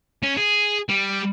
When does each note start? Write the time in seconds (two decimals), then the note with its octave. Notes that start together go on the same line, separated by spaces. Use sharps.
0.23 C#4
0.37 G#4
0.89 G3